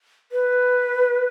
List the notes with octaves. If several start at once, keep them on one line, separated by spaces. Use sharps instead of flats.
B4